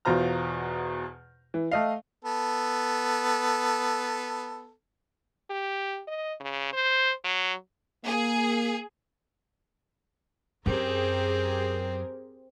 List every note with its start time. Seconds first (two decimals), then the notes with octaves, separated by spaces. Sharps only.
0.05 E2 B2 F4 C5 A#5 F6
1.54 E3
1.72 A3 D#5 F5
2.24 B3 A4
5.50 G4
6.07 D#5
6.40 C#3
6.73 C5
7.24 F#3
8.05 A#3 G#4
10.66 F#2 C4 G4 G#4 A#4